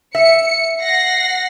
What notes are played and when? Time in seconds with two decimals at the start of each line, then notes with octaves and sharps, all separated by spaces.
0.15 E5 C#7
0.81 F#5 A#6 C7